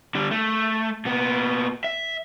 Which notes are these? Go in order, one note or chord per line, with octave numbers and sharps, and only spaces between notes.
D3 G3
A3
A#2 B3
E5